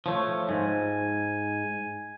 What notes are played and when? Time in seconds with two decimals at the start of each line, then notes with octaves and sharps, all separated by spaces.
0.06 F3 A3 C#5
0.49 G#2 G#5